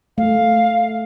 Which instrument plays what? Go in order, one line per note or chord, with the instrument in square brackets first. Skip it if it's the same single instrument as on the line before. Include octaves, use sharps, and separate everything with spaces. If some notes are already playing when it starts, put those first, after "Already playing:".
[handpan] A3 [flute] F5